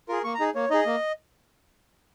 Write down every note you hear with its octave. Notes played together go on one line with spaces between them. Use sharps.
F4 G#4 A#4
A#3 C#6
A#5
D#4 G#4
A#3 C#5
D#4 G#4 D#5
A#3